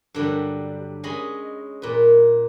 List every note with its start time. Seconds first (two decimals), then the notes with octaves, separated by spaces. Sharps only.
0.14 G2 D3 F#3 G3
1.04 G#3 C#4 G#4 D#5 G#5 B5
1.82 A#2 B4